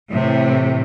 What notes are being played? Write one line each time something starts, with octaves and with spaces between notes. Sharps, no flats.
A2 C3 E3